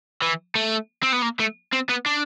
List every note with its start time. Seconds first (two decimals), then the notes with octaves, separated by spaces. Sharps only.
0.22 E3
0.55 A3
1.03 C4
1.12 B3
1.22 A#3
1.39 A3
1.72 C4
1.89 B3
2.06 D4